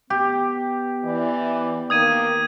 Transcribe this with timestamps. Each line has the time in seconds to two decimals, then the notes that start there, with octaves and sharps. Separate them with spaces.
0.10 B3 G4
1.05 E3 D5
1.90 D#3 A#3 D#6 G#6 D#7